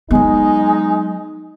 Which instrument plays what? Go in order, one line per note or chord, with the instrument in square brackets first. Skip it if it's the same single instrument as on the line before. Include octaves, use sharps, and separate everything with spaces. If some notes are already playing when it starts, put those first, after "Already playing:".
[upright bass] F#3 B3 [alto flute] G#3 [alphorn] D#4